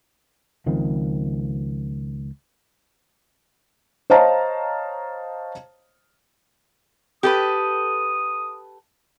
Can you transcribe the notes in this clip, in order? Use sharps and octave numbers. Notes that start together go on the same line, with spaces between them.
C#2 D#3 F3 C4
C5 C#5 D#5 F5 A5 A#5
G4 A4 B4 D#6